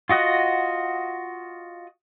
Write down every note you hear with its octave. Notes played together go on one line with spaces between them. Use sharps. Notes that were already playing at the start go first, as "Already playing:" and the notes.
F4 F#4 D#5 F#5